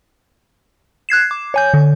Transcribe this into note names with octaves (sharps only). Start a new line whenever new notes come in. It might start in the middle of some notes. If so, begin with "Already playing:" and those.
F#6 G#6 C7 E7
D6
C#5 G#5 G6
D3